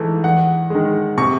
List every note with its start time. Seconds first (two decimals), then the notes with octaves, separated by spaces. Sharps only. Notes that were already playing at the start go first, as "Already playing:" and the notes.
Already playing: G#2 E3 A3
0.24 E2 F#5
0.70 D#3 G#3
1.17 C3 C#6